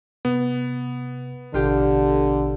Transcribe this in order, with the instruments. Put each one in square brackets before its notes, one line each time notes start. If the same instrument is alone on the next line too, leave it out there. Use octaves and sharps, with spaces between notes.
[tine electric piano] C3 [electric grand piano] B3
[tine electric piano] A1 B2 [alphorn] D3 [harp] F4 G4